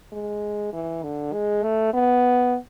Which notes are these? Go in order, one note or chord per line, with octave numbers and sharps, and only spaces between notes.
G#3
E3
D3
G#3
A3
B3